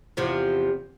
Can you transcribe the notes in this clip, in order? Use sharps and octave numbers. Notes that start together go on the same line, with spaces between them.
E2 C3 F3